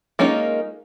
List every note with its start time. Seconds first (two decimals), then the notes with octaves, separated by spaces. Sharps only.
0.19 G#3 A#3 C#4 D#4 F4